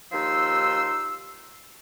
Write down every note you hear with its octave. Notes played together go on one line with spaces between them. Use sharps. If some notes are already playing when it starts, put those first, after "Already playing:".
D#2 F3 D#4 C6 E6